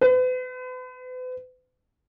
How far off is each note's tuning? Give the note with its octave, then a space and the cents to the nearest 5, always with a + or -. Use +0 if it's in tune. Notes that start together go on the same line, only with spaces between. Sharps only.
B4 +40